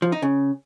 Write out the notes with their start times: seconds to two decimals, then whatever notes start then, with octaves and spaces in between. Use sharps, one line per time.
0.02 F3
0.12 D#4
0.22 C#3